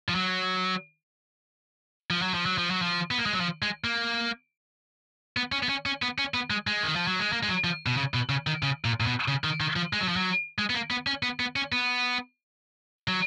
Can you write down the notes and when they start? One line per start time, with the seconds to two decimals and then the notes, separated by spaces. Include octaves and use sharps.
0.09 F3
0.15 F#3
2.10 F3
2.22 F#3
2.34 F3
2.46 F#3
2.58 F3
2.71 F#3
2.82 F3
3.11 B3
3.19 A#3
3.26 G#3
3.33 F#3
3.40 F3
3.62 G#3
3.84 A#3
5.37 B3
5.52 C#4
5.63 B3
5.69 C#4
5.86 C#4
6.02 B3
6.18 C#4
6.34 B3
6.50 G#3
6.67 G#3
6.83 D#3
6.96 F3
7.07 F#3
7.19 G#3
7.33 A#3
7.43 G#3
7.48 F#3
7.64 F3
7.86 B2
7.97 C#3
8.14 B2
8.29 C#3
8.47 D#3
8.63 C#3
8.85 A#2
9.00 A#2
9.06 B2
9.28 C#3
9.44 D#3
9.60 D#3
9.76 F3
9.93 G#3
10.00 F#3
10.08 F3
10.16 F#3
10.58 G#3
10.70 B3
10.75 A#3
10.91 B3
11.07 C#4
11.23 B3
11.40 B3
11.56 C#4
11.72 B3
13.08 F#3